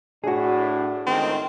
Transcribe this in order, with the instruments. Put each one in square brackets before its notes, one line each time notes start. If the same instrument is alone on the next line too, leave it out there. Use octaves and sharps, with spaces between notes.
[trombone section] A2 D4 [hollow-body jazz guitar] F#4 G#4
[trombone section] C#2 D#3 A3 [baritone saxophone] C4